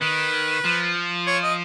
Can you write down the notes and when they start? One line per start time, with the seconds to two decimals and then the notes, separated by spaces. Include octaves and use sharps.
0.01 D#3 B4
0.65 F3
1.27 C#5
1.43 D#5